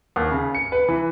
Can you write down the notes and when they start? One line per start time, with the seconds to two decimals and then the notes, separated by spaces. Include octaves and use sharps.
0.16 D#2
0.31 C#3
0.55 C#7
0.72 B4
0.89 E3